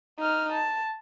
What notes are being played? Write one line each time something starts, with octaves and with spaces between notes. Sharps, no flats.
D#4 F6
A5